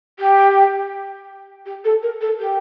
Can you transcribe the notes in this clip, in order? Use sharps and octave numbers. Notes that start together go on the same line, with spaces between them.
G4
G4
A4
A#4
A4
G4